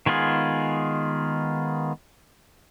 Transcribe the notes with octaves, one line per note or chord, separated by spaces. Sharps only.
D#3 G#3 B3 F4 G#4